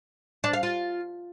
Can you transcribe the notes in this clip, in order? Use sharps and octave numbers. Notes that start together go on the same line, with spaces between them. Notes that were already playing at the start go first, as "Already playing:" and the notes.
D4
F5
F4